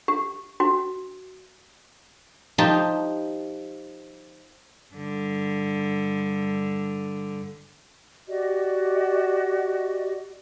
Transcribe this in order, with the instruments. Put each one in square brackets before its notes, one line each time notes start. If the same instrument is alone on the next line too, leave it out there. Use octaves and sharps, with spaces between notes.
[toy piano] G4
F#4
[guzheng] F3 D#4 G4 A5
[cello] G2 D3
[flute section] F#4 G4 D5 D#5